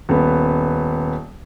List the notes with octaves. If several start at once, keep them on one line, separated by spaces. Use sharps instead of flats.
D#1 B3